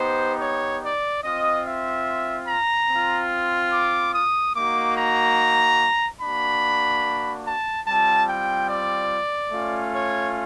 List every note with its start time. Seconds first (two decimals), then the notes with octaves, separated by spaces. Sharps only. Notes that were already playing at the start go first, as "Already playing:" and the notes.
Already playing: B3 D#4 G4 C5
0.42 C#5
0.84 D5
1.24 C4 F4 D#5
1.66 E5
2.48 A#5
2.90 C4 F4
3.73 D6
4.15 D#6
4.56 A#3 D#4 F#4 D6
4.98 A#5
6.22 A#3 D4 F#4 B5
7.46 A5
7.87 G3 C4 F4 A5
8.29 G5
8.70 D5
9.53 A3 C#4 F4
9.95 C#5